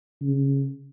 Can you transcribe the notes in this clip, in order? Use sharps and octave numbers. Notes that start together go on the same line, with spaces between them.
C#3